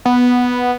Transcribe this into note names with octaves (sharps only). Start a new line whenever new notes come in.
B3